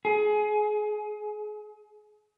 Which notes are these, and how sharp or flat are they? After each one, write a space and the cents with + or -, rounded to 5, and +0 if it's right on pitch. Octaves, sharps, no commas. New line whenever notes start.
G#4 +25